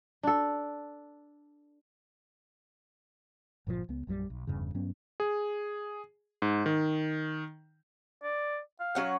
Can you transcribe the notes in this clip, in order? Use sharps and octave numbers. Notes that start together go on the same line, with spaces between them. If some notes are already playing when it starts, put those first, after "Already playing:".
D4 A4
G1 A#2 C#3 F3
C#2 B3
A#1 F#2 E3 G3
B1
F1 E2 G2 C#3
G2 F#3 B3 C#4
G#4
G#2
D#3
D5
F5
F#3 C#4 F#5